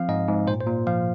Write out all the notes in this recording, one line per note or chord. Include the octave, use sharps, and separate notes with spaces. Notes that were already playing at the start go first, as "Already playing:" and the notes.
Already playing: F3 C4 F5
G#2 D#5
G#2
A#2 C5
C5
A#2
F3 F5